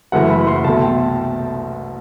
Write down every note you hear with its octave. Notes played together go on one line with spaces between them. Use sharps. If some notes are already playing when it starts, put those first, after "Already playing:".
F#1 F#2 E3 A3 F#5
B5
C6
C2 B2 A3 A5
G5